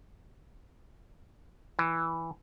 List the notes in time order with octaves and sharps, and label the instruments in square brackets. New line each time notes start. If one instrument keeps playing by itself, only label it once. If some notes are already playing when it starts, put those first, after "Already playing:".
[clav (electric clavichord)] E3